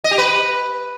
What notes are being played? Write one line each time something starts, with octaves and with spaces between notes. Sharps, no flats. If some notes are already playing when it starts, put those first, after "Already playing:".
D#5
G4
B4